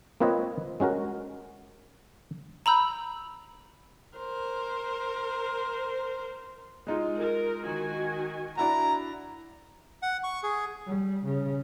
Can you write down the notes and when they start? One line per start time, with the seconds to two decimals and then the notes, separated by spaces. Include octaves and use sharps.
0.20 A#3 C4 F4 B4 C#5 D#5
0.80 G#3 C#4 F#4 A#4
2.66 A#5 B5 E6 G6
4.17 A#4 C5
6.87 G#3 D#4 F4
7.18 A#4
7.64 D#3 F#4 G#5
8.57 D4 E4 F#4 A#5
10.02 F#5
10.24 C#6
10.43 G#4
10.87 G3
11.26 C#3